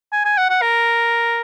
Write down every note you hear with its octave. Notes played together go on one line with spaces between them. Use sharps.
G#5
G#5
F#5
F#5
A#4